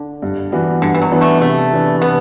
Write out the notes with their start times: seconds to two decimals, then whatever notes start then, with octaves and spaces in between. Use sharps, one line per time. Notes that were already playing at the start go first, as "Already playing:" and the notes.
Already playing: D3
0.22 G2
0.52 E3 B3 D4 F#4
0.82 G2 D3
0.94 E3
1.02 F#3
1.12 E3 B3 D4 F#4
1.21 A3
1.41 C3 A3
1.71 E3 B3 D4
2.02 C3 B3